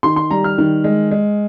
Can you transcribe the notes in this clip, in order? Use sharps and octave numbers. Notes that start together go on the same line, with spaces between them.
D#3 C6
C6
G3 A#5
F6
D#3
G#3
G#3